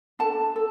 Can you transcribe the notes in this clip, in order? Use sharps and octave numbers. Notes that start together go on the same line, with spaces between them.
D4 A4 A5
A4